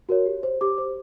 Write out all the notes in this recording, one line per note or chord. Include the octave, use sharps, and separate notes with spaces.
F#4 A#4 C#5
G4
C5
G4 D6
C5